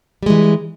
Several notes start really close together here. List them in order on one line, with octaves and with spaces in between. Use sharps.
G3 G#3 E3